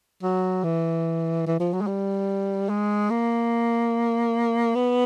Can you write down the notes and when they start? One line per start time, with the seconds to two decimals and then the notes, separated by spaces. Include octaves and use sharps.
0.23 F#3
0.64 E3
1.46 E3
1.60 F3
1.73 F#3
1.81 G#3
1.87 G3
2.69 G#3
3.10 A#3
4.75 B3